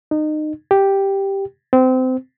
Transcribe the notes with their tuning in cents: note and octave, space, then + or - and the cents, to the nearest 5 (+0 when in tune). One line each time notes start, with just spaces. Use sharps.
D#4 -25
G4 +0
C4 -25